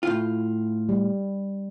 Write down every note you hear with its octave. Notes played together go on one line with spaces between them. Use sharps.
A2 F4
G3